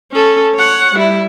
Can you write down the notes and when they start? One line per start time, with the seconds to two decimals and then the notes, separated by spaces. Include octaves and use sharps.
0.12 C#4 A4
0.55 C#5 F#5
0.95 G3 E4